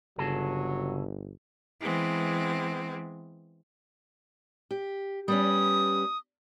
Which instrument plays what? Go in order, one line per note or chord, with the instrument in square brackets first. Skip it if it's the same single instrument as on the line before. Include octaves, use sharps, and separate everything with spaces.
[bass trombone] G1 [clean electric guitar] C#3 G#4 A4 [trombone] F#3
[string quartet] E3 G#3 B3 C4
[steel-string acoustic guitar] G4
[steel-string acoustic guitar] G3 B3 C#4 [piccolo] D#6